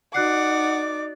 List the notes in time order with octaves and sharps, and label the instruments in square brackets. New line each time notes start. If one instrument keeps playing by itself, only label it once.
[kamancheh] D#4 D6 [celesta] F#4 F#6 C7 [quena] D5 [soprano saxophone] F#5